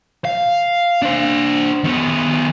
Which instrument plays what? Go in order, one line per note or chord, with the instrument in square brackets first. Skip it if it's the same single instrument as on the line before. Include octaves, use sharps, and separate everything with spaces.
[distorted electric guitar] F5
D4 C5
D#3 B3